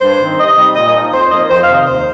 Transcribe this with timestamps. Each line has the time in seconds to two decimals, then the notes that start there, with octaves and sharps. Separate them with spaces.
0.01 G2 C5
0.20 D#3 C4 D#4
0.38 C3 D#5
0.57 G3 D#4
0.75 A#2 D#5
0.89 D#5
0.95 F3 D#4
1.13 F2 C5
1.31 F3 A#3 D#4 D#5
1.50 F2 C5
1.63 F5
1.69 C3 D#3
1.75 D#5
1.87 D#2 C5